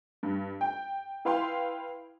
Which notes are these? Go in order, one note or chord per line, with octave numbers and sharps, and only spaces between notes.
G2
G5
E4 B4 F5 G5 C6